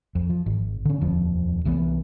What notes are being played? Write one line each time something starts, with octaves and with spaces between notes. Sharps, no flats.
F2
F3
G#1
D3 C#4
D#1 F2 F3
C2 E3 F3 B3